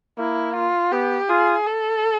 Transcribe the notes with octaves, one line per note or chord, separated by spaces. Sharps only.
A#3 E4
F4
B3 G4
F4 G#4
A4